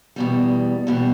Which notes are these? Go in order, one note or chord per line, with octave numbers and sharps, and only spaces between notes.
E2 B2 G3
E2 B2 G3